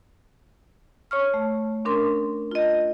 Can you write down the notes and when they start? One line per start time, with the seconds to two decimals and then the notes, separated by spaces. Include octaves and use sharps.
1.11 C#5 C#6 F6
1.34 A3
1.85 C#4 D4 A#4 C6
2.51 F4 D#5